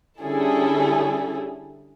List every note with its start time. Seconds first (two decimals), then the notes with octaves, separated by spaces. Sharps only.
0.21 D3 G3 C#4 E4 G#4 A4